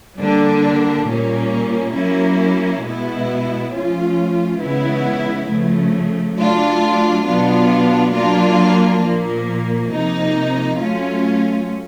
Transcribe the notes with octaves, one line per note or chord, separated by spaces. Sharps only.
D3 G3 A#3 D4
A#2 G3 A#3 C#4
F#3 A#3 C#4 E4
B2 G#3 B3 E4
F3 A3 C#4 F4
C#3 E3 G#3 B3 E4
C#3 F3 A3
F#3 A3 D4 F4
B2 F#3 B3 D4 F4
F#3 A#3 D4 F4
A#2 F3 A#3
C3 F3 A#3 D#4
F#3 A3 C#4 F4